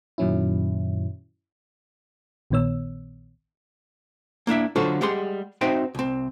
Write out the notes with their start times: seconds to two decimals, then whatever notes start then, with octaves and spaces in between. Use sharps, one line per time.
0.18 F#2 A#2 D#3 F#3 C#4 E4
2.51 A#1 A#2 D#3 B3 C#5 E6
4.47 A#3 D4 E4 E5
4.76 D3 F#3 F4 F#4 A4 C5
5.01 G3 G#3 G4 G#4 F#5 C6
5.61 C4 D#4 F#4 C5 E5 G5
5.95 C2 C4